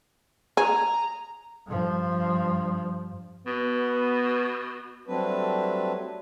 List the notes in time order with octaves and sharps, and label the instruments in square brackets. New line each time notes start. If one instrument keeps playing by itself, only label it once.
[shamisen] G#4 [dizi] A#5
[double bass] G2 F3
[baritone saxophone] B2 [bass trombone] B3
[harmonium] F#3 G3 A3 C4 D4 B4